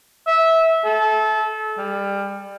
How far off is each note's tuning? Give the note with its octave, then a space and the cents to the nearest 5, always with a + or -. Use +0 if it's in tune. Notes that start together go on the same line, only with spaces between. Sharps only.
E5 -15
A4 -30
G3 +25